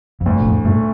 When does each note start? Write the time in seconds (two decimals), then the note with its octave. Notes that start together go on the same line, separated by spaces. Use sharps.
0.21 F2
0.26 D2 G2
0.41 A#2
0.45 F2 A2
0.65 G2 A#2 A3